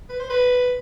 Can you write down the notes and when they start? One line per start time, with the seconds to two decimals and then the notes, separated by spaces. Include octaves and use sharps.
0.09 B4
0.20 C5
0.29 B4